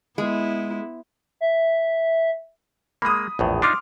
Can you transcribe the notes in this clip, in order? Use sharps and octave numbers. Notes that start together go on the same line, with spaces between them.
G#3 B3 E4
E5
G#3 A#3 B5 D#6
A#1 E2 A2
D4 D#4 F4 C6 D6 F6